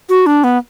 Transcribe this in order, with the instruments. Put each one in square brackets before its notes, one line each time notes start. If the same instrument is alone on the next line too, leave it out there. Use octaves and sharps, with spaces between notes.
[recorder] F#4
D4
B3